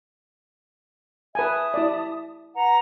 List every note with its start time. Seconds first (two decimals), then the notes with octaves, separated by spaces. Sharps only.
1.35 B4 E5 G#5 A5 D#6
1.74 E4 D5
2.54 B4 F#5 A#5